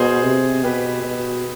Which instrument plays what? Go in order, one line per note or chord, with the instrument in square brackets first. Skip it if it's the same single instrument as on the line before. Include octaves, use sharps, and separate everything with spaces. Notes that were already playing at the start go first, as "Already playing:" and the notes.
Already playing: [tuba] B2 [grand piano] G#4 C5
[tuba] C3
[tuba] B2 [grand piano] G4 B4
[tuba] B2